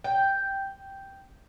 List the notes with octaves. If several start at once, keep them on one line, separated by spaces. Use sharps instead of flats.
G5